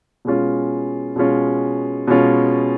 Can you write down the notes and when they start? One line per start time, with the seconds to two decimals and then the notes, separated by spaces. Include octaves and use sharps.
0.25 B2 G#3 C#4 F4
1.16 B2 G#3 C#4 F4
2.07 B2 G#3 C#4 F4